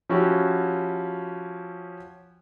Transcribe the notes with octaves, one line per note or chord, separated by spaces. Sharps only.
F3 C#4 E4 F#4 G4